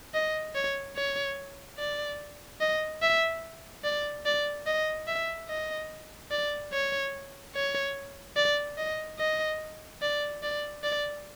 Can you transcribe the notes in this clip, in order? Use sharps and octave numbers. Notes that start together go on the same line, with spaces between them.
D#5
C#5
C#5
D5
D#5
E5
D5
D5
D#5
E5
D#5
D5
C#5
C#5
D5
D#5
D#5
D5
D5
D5